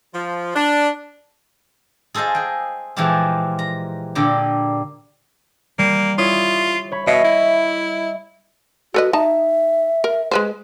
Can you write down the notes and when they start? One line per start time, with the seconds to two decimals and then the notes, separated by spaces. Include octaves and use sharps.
0.14 F3
0.55 D4
2.14 G#4 A4 C5 D#5 F5
2.35 G#4 G5
2.96 A#2 E3 F3 G#3 F4 G4
3.59 A#5
4.15 A#2 D3 A#3 D4 G4
5.79 G3 A#3
6.18 E4 F4 C#5 D#6
6.92 C#5 B5
7.07 B2 C#5 D#5 E5
7.24 E4
8.94 F#4 A4 B4 D#5
9.13 D#4 E5 A5
10.04 A#4
10.31 G#3 B4 C5